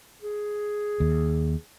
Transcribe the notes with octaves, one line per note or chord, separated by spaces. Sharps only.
G#4
D#2